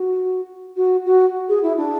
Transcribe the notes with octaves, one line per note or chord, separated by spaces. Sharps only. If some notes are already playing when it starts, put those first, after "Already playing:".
Already playing: F#4
F#4
F#4
G#4
E4
D4